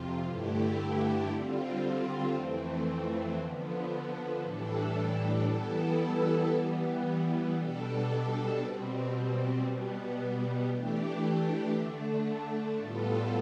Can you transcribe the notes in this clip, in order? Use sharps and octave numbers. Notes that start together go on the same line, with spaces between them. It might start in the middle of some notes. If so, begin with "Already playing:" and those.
Already playing: F2 C3 F4
G2 D3 A3 E4 G4
D3 G3 C4 F4
F2 E3 A3 C4
D3 F3 B3
A2 E3 G3 D4 A4
E3 G3 B3 E4 A4
E3 G3 B3
B2 G3 D4 A4
B2 G3 C4
B2 G3 B3
E3 A3 D4 G4
D3 A3 D4
A2 G3 B3 F4 A4